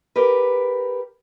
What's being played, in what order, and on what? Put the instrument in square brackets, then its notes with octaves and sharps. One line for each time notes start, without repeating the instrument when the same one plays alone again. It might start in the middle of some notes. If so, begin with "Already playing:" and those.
[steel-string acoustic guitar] G4 A#4 B4